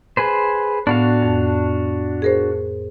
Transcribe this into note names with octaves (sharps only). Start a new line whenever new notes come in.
G#4 B4 C5
A2 B3 D4 F#4 F5
F2
G#4 A#4 C5